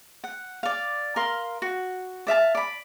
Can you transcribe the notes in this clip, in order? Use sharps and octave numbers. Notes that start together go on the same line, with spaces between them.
F#5
D5 F5
A#4 F5 C6
F#4
D5 E5 F5 A5
D5 B5